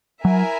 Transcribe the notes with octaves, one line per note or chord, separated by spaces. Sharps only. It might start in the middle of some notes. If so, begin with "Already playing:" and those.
F#3 E4 A#4 E5 G#5